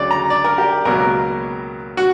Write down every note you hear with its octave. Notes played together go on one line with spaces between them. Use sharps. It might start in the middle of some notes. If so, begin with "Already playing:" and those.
Already playing: D2 C#3 F#3 D5
A#5
D5
A#4
G4
C#2 B2 F#3 A#3 A#4
F#4